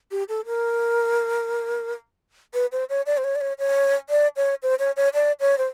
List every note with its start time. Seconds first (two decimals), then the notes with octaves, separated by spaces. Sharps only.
0.11 G4
0.29 A4
0.46 A#4
2.54 B4
2.72 C5
2.90 C#5
3.06 D5
3.17 C5
3.24 C#5
3.35 D5
3.41 C#5
3.59 C#5
4.10 D5
4.36 C#5
4.63 C5
4.79 C#5
4.97 C#5
5.14 D5
5.40 C#5
5.58 C5